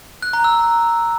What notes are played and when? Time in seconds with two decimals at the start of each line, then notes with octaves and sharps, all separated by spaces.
0.22 F#6
0.33 A#5
0.44 E6